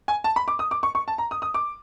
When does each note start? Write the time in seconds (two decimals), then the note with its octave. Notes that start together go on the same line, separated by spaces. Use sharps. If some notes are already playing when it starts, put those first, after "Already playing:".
0.08 G#5
0.24 A5
0.36 B5
0.48 D6
0.59 D#6
0.71 D6
0.83 C#6
0.95 C#6
1.08 A5
1.18 A#5
1.31 D#6
1.42 D#6
1.54 D6